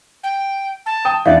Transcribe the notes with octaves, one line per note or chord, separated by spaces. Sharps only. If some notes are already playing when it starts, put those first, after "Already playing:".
G5
A5
G5 D#6
E2 E3 B3 D4 D5 F5